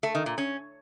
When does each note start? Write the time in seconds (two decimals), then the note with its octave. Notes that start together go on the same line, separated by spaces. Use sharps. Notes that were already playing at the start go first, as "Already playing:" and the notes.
0.03 A3
0.15 D#3
0.26 A#2
0.38 C#4